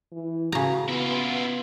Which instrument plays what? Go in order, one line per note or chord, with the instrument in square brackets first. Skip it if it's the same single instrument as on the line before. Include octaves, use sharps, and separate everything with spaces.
[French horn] E3
[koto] C#3 A#5 [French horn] F#4
[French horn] B3 [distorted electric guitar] E4 F4